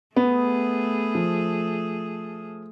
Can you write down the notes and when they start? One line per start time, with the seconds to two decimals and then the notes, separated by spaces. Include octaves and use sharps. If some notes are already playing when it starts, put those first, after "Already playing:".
0.16 A3 B3 G#4
1.15 F3